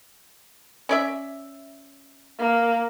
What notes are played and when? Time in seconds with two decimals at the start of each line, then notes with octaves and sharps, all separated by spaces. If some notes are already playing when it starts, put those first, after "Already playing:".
0.89 C#4 D5 E5
2.39 A#3